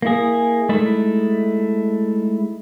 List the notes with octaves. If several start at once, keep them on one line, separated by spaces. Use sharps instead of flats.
A#3 E4 G#4
G#3 A3 D#4 E4